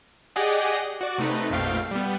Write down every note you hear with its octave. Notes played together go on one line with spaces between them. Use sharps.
G4 G#4 D5 D#5 F#5
F#4 D5
C3 A3 D#4 B4
A#1 F2 B2 A3 F5 G5
G3 B3